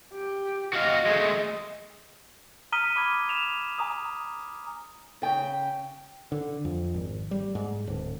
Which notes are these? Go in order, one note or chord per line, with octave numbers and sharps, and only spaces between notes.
G4
F#4 D#5 F5
G#3 A3
A#5 D#6 F6 B6 D#7 G7
B5 D6 F6 G#6
E7 F7
G#5 A#5 D#6
C#3 G5
D3
F2
G#1
G3
G#2
D1